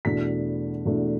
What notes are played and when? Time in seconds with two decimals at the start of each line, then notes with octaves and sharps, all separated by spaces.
0.05 E2 B2 A3 D4 B6
0.85 E2 B2 A3 D4